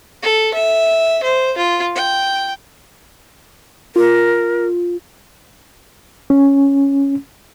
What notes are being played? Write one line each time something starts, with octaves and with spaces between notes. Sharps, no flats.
A4
E5
C5
F4
G5
F4 A#4
C#4